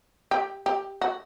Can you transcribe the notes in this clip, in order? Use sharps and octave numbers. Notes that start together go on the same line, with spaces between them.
G4
G4
F#4